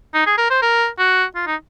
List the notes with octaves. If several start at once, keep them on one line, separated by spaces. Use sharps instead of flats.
D#4
G#4
A#4
C5
A#4
F#4
F4
D#4